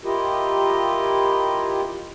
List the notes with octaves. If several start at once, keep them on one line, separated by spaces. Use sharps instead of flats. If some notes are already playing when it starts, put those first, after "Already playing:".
E4 F4 G4 A#4 D#5